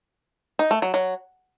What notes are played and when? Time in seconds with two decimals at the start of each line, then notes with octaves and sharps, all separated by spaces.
0.59 D#4
0.71 A3
0.82 F#3
0.94 F#3